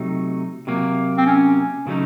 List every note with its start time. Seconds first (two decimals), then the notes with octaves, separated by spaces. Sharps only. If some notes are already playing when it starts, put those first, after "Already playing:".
Already playing: C3 F#3 A3 D#4
0.67 C3 F#3 A#3
1.18 C4
1.26 C#4
1.87 C#3 F#3 A3 D#4